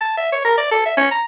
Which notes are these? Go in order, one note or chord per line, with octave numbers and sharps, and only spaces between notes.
A5
E5
C#5
A#4
D5
A4
E5
C#4
A#5